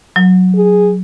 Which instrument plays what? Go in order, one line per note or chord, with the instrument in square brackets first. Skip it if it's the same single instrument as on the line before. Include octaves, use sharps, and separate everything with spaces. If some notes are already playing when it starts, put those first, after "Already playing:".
[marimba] F#3
[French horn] G#4